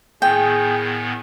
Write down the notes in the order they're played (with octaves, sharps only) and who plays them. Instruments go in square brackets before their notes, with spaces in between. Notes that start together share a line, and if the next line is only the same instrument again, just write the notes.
[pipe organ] A2 D#3 B3 [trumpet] G#4 [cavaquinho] G5